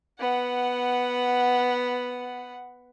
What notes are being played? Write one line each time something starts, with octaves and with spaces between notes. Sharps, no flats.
B3 F#5